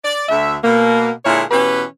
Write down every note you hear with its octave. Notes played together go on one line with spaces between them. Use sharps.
D5
D2 E5
B2 A#3
A#2 D3 G#3 A#3 E4 C#5
B2 E3 C#4 G4 B4